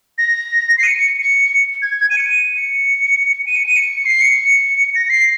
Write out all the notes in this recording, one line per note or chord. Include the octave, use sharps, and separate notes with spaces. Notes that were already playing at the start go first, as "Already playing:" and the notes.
A#6
C7
D#7
C#7
C#7
C#7
G#6
G#6
D#7
C#7
D#7
C#7
D#7
C#7
D#7
C#7
C7
C#7
A#6
C7